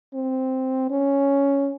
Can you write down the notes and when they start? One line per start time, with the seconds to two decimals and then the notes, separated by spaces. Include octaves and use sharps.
0.14 C4
0.90 C#4